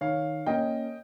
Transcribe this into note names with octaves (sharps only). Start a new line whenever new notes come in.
D#3 C#5 F5
A#3 C#4 D#5 G5